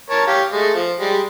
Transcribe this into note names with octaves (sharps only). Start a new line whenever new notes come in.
A#4 C#5 A5
G4 C#5 F5
G#3 A3
F3
G3 G#3